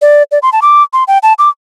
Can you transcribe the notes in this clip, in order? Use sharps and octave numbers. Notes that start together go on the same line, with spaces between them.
D5
D5
C6
A5
D6
C6
G5
A5
D6